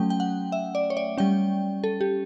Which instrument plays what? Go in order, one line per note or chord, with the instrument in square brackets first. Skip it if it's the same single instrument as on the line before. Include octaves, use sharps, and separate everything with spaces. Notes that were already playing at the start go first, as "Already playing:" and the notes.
Already playing: [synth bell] F#3 A3 C#4 G5
G5
F#5
E5
D5
C#5
D5
G3 C#4 G5
A4
G4